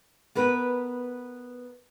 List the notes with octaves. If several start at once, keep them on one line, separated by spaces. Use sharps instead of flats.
B3 A#4 B4